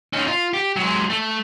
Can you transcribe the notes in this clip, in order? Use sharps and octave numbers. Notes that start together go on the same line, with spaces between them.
C#4 D#4
F4
G4
F#3 G#3
A3